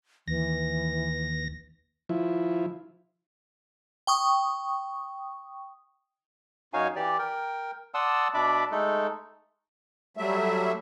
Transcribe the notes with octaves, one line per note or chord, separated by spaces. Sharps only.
D#2 E3 A#6
F3 E4
G5 C#6 D#6
F#2 D#4 F#4 C#5 F5 G#5
E3 G4 D5
A#4 G5
D5 F#5 A5 C6 D#6 E6
B2 D4 D5 E5 B5 D6
G#3 A3 D#4 A4
F#3 G3 A3 E5